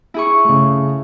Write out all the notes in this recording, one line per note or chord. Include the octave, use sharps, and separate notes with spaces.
E4 G#4 C#6
C#3 A3